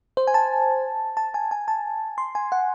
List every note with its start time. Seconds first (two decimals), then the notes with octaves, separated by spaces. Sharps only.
0.17 C5
0.27 G#5
0.34 A5
1.17 A5
1.34 G#5
1.51 G#5
1.68 A5
2.18 C6
2.35 G#5
2.52 F#5